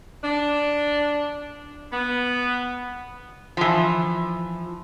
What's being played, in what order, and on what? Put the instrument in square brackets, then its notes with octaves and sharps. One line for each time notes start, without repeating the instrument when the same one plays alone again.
[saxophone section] D4
B3
[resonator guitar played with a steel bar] E3 F3